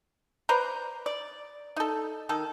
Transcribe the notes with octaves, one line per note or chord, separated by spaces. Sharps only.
B4 C5 D5 A#5
D5
D#4 A4
D#3 A4